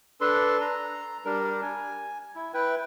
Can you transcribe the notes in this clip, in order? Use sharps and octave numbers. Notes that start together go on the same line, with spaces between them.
D4 A4 B4 C6
A#5
G3 D4 A#4
G#5
E4
E4 B4 G5